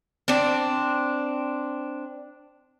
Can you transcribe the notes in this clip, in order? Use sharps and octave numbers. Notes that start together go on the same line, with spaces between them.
C4 D4